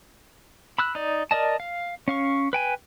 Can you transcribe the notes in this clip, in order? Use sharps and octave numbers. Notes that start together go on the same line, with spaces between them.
B5 E6 F#6
D#4 D5
A#4 D5 D#5 A5
F5
C#4 F5 C#6
B4 G5 G#5